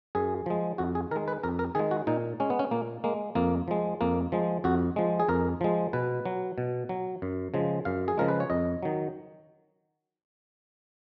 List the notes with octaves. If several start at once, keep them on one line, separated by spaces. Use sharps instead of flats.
F#2 G#4
F3 G#3
F2 F#4
G#4
D#3 G#3 A#4
B4
F2 A#4
A#4
D#3 G#3 G#4
F#4
A#2 D#4
G#3 C#4
B3
C#4
A#2 A#3
G#3 A#3
F2 A#3
F3 G#3
F2 A#3
F3 G#3
F2 F#4
F3 G#3
G#4
F2 A#4
F3 G#3
B2 B4
F#3
B2
F#3
F#2
C#3 F3 G#3
F#2 F5
G#4
C#3 F3 G#3 A#4
B4
C#5
F2 D#5
D#3 F#3